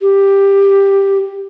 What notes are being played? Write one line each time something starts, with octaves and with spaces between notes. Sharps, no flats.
G4